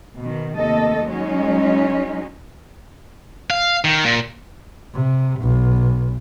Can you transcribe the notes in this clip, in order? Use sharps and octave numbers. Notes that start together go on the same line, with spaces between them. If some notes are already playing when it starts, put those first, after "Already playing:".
B2 D#3
D#2 C3 A3 A4 D#5
F#3 G#3 C#4 D#4
F5
D#3
A#2
C3
B1